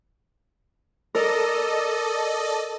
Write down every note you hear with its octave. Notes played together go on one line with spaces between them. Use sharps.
A4 A#4 D5 D#5